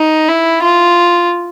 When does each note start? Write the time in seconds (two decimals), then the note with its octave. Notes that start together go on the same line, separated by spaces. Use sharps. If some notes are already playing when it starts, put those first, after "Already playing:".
Already playing: D#4
0.28 E4
0.62 F4